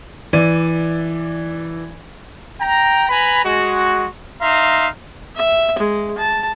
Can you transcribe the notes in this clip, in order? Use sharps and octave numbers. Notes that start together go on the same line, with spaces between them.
E3 D5 D#7
G5 A#5
B4 G#5 A#5 B5
G#3 F#4
D#4 E5 F5 A#5 C6
E5
G#3
A5